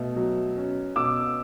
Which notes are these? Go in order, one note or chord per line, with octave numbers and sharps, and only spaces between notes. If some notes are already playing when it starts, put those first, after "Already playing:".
Already playing: B2 A3
F#3
C#4
B2 D6 E6